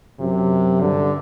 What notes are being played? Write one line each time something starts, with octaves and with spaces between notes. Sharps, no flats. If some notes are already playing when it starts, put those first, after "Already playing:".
F#2 C3
G2 D3